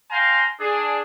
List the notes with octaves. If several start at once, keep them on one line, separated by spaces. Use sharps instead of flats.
F5 G5 G#5 A#5 C6
D4 G#4